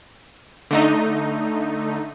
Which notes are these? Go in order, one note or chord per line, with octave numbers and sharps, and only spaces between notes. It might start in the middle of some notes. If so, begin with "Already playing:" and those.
D3 A3 D#4